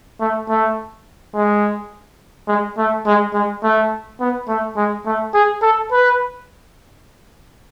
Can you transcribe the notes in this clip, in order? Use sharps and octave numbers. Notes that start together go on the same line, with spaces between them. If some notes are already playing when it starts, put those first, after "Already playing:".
A3
A3
G#3
G#3
A3
G#3
G#3
A3
B3
A3
G#3
A3
G#4
A4
B4